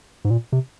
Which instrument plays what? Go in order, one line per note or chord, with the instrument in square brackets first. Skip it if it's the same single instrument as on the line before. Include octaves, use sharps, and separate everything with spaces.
[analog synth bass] G#2
A#2
C3